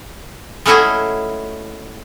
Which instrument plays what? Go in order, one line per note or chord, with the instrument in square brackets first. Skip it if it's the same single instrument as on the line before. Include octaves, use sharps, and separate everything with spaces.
[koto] G#3 A3 C#4 E4 F#4 G#4